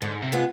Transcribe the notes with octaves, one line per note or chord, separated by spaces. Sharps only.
G#2 D3
C3
G#3 B3 F4 G#4